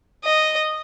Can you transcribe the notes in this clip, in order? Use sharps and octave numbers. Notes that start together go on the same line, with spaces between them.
D#5